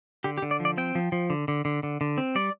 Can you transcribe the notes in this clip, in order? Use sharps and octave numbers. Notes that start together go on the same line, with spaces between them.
D3 G4
G4
D3
D5
F3
D5
C4 G5
F3
F3
D3
D3
D3
D3
D3
C4
G3 D5